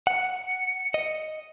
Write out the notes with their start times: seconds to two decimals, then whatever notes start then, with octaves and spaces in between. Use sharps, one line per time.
0.07 F#5 C#7
0.94 D#5